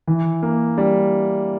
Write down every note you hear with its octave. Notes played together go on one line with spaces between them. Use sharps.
E3
A#3
G3